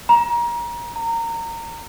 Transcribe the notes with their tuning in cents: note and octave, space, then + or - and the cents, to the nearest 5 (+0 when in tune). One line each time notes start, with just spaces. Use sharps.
A#5 +25
A#5 -20